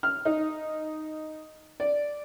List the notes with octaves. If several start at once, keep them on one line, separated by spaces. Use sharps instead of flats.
F6
D#4
D5